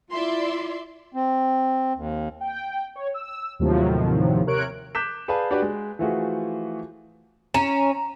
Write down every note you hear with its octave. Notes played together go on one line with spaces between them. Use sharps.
E4 F4 D5 E5 C6
C4
D#2
G5
C#5
E6
D#2 A2 C3 D#3 F3 F#3
C3 A#4 C#5 F#6 D7
D6 F#6 G6 B6 E7
G#4 B4 D5 F5 G#5 A5
D4 F#4 G4 B4 D5
G#3
E3 F3 A3 F4 F#4 G#4
C#4 A#5 E7